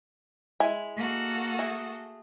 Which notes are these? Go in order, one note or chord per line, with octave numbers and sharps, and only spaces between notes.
G#3 E4 G#5
A#3 F#4 A4
A3 G#4